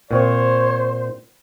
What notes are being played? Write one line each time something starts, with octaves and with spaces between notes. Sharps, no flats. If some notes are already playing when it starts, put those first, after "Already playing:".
A#2 C4 C5 C#5